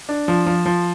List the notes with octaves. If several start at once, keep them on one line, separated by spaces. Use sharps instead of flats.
D4
F3
F3
F3